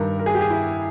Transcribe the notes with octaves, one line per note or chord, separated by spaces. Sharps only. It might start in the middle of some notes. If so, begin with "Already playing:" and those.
Already playing: G2 D#3 A#4
A#4
G#4
G4
G#4
E4